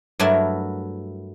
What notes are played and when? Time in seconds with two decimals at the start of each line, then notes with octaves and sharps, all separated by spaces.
0.19 G2 F#3 A3 E4 A#4 E5